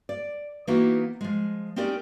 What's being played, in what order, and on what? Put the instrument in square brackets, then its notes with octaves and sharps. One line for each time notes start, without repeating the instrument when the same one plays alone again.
[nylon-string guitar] D5
E3 A#3 B3 D#4 E4 F#4
F3 G#3
C4 C#4 D#4 G4 A#4 D5